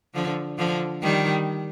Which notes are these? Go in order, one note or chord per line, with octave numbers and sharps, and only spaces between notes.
D3 F3
D3 F3
D#3 G3